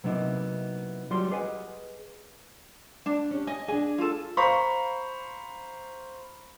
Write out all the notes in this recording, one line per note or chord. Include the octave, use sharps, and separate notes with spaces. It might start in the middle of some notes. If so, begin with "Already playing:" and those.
C3 F#3 A#3 B3 D#4 E4
F#3 G3 F4 F#4 C6
G4 G#4 B4 D#5 F#5 G#5
D4
C#4 G4
D#5 G#5
D4 G#4 G#5
F4 A4
C5 F5 A#5 B5 C#6